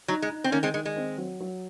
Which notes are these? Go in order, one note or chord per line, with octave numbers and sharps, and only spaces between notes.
F#3 D#4
G#3
D#4
C4
D#3 A#3 C#4
G#3 C4
D#3 G#3
G#3
C4
F#3
F#3